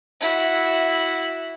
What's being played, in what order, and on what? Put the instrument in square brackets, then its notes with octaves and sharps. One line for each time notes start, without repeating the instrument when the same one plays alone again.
[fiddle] E4 F#4